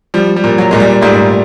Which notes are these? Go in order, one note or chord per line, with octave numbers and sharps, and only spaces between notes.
F3 G3
G3
A#2
F#3
A#2 G#3
G3
G#2 G3 A3